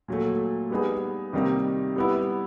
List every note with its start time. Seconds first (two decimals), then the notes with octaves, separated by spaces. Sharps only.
0.08 A#2 F#3 A3
0.70 G3 B3 D#4 G#4
1.33 C3 D#3 G3 A#3 D#4
1.96 G3 B3 E4